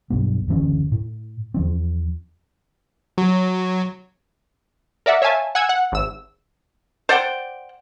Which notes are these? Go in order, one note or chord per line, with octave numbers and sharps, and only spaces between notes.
B1 G2 B3
F#1 D2 E3 C#4
A2
E2 F3 C4
F#3
A#4 D5 E5 F#5
C#5 E5 F5 G#5 A5
F#5 G#5 E6 G#6
F#5
G#1 E6
C5 D5 F#5 G5